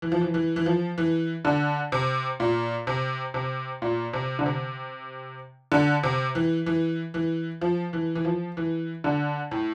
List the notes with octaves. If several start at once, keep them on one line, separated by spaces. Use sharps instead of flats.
E3
F3
E3
E3
E3
F3
E3
D3
C3
A#2
C3
C3
A#2
C3
D3
C3
D3
C3
E3
E3
E3
F3
E3
E3
F3
E3
D3
A2